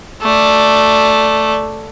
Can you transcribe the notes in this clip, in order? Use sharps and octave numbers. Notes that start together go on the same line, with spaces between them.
A3 D5